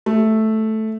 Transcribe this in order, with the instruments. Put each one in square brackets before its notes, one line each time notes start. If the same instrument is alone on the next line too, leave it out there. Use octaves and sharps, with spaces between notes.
[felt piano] A3